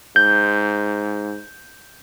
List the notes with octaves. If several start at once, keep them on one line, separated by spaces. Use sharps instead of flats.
G#2 G6